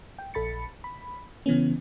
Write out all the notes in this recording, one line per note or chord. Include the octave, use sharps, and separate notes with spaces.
G5
A#1 A4 B5 A6 C#7
B5
C#3 E3 B3 C#4